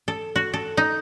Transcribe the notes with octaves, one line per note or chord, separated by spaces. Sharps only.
A4
F#4
A4
D#4